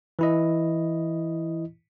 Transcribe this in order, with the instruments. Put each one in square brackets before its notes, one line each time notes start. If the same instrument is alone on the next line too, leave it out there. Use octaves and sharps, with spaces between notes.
[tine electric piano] E3 E4 D#5